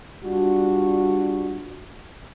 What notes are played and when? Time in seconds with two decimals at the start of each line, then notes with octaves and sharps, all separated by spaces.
0.24 G3 D4 F4 F#4